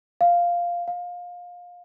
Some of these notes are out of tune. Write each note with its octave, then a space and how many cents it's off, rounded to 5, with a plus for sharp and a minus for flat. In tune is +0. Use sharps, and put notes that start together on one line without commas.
F5 +0
F5 +25